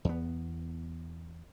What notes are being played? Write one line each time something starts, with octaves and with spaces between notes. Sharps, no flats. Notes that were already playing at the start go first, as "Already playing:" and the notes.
E2 B3